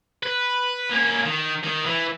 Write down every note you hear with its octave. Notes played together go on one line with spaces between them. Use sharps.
B4
A#3 C#4
D#3
D#3
E3